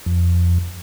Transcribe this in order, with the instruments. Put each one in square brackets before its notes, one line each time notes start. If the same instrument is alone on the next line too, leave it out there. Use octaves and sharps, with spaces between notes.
[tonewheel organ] F2